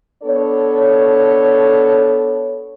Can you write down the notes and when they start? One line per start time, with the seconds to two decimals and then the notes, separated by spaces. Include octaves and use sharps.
0.23 B3 D4 A4 C#5